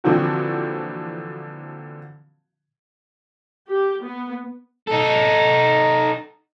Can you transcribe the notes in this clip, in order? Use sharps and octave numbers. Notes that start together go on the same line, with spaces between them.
A#2 D3 E3 F3 C4 F#4
G4
B3
D#4 A4